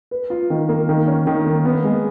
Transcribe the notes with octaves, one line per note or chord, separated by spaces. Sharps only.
B4
F4
D#3
A#3
D#3
C#4
D#3
A#3
B3
G#3